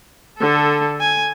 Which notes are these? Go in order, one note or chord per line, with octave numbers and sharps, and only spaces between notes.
D3 A4
G#5